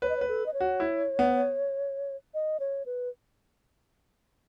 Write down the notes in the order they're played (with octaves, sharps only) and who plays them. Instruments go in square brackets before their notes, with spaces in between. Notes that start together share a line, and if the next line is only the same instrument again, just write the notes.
[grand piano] B4 [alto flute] C#5
[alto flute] D#5
[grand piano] B4 [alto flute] C#5
[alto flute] A4
D#5
C#5
[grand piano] F#4
E4
B3
[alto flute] D#5
C#5
B4